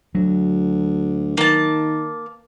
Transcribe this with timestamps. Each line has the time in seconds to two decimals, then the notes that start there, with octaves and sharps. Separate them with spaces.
0.15 D2 F#3
1.37 D#3 A#3 A5